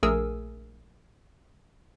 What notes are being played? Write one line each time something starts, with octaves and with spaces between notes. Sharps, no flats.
A#1 A3 G#4 A#4 G#5 E6